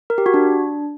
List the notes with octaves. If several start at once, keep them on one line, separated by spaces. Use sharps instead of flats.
A#4
G4
F#4
D4